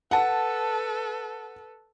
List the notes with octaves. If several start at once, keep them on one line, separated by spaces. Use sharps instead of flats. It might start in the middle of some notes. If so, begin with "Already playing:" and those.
A4 B4 F#5 A5